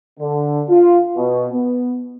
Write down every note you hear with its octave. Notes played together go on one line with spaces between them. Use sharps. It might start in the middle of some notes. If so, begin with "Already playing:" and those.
D3
F4
B2
B3